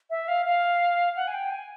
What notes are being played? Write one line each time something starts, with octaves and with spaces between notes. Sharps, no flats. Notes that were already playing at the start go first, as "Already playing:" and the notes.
E5
F5
F5
F#5
G#5
G5
G#5